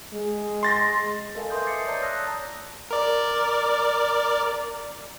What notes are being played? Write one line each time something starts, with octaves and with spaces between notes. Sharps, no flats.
G#3
C6 A6 A#6
A4 A#4 D#5 F5 G#5 A5
B4 E5 C6 D#6 G6
D6 A6 C7 C#7
C#5 D5 A5 A#5 G6
A5 A#5 D#6 E6 F#6 A#6
A#4 D5